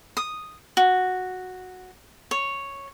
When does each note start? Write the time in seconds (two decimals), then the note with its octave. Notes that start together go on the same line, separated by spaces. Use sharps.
0.17 D#6
0.77 F#4
2.31 C#5